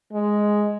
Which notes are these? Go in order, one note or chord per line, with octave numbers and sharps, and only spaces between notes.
G#3